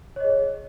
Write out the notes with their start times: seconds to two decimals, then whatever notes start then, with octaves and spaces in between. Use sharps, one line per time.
0.16 C#5
0.20 D#5
0.24 G#4